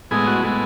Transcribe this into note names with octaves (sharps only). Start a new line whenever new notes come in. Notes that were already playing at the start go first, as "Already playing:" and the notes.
A2 G#3 B3 G#4
F#4
A2 G#3 B3